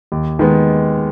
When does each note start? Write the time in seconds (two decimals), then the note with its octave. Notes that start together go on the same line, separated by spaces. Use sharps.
0.12 D#2
0.39 D#3 G#3 B3